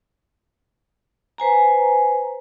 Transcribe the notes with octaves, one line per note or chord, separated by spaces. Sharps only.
B4 C5 G#5 A#5